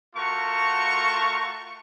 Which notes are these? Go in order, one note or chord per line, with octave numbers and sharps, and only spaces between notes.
A3 F4 F#4 A#4 A5 C#6